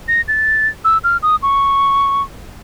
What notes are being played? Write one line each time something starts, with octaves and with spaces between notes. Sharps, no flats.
A#6
A6
E6
F6
D#6
C#6